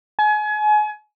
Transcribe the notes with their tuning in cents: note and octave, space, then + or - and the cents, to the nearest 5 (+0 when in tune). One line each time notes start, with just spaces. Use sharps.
G#5 +30